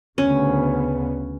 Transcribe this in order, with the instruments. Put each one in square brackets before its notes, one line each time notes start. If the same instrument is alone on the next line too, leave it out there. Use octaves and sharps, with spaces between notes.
[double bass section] D2 C#3 B3 [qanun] C#4